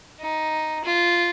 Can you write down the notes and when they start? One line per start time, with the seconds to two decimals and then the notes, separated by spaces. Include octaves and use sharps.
0.19 D#4
0.84 F4